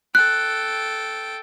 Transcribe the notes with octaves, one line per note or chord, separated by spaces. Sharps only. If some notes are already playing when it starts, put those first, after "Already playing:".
A4 G5 F#6